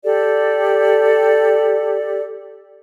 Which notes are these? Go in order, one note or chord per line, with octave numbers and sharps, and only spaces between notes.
G4 A4 D5